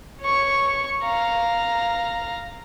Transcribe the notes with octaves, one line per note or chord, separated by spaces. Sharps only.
C#5 C#6
F5 A#5